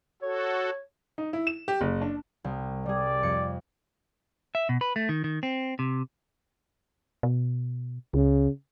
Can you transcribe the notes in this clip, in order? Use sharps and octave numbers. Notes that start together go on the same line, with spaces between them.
F#4 A4 C#5
D#4
E4
E7
G4
F#1
D4
C2
G3 G#4 D5
F2 C#7
E5
B2
B4
A3
D#3
D#3
C4
C3
B2
C#2 C#3